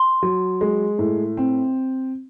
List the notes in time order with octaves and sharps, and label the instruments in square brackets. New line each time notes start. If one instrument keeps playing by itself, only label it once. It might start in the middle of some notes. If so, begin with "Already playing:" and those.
Already playing: [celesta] C6
[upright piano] F#3
G#3
A2
C4